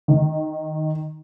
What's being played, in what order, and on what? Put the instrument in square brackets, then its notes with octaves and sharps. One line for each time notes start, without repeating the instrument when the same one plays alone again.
[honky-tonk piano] D#3